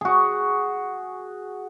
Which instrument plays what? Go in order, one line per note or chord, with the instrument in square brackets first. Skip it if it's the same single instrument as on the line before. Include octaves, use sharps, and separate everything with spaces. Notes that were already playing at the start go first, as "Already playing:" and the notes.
[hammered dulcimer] F#4 G#4